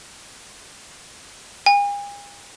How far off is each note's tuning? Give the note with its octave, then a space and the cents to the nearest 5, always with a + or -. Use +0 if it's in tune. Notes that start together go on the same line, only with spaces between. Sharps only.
G#5 -45